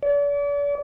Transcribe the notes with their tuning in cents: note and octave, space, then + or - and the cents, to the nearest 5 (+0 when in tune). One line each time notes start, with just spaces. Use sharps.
D5 -40